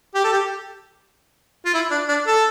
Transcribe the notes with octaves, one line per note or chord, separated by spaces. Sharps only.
G4
A4
G4
F4
E4
D4
D4
A4